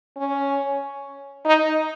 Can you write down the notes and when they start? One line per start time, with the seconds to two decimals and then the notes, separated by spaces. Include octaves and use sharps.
0.17 C#4
1.46 D#4